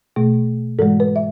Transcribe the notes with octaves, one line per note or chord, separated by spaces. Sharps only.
B2 A3
G#2 E3 G#3 A4
B4
E5